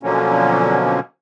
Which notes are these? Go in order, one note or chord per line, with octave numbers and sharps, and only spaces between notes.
B2 D3 F3 F#3 A#3 C#4